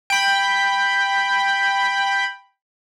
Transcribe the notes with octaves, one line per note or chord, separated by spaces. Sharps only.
G5 B5